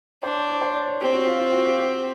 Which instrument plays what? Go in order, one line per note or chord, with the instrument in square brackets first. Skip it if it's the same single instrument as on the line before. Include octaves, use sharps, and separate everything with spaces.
[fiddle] D4 [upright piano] C5
[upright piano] C#5
C#5
C5
D5
C#5
[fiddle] C4 [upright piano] G4
[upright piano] F#4
F4
F4
F#4
G4
G4